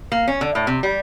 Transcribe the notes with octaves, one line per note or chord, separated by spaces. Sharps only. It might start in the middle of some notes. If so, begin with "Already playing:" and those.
A#3
C#4
D3
A2
C3
G3